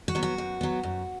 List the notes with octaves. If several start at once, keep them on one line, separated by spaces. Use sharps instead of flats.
F#4
F#3 B3
F#4
F#2
F#3 B3
F#2